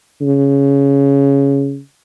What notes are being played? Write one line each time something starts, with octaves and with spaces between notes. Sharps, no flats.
C#3